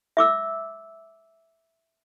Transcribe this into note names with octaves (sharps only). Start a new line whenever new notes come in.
E5 D6 E6